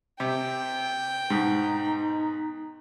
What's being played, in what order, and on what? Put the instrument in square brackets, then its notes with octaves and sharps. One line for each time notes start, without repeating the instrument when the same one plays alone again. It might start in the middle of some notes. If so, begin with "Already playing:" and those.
[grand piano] C3 [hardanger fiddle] G5
[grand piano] G#2 B2 [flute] D#4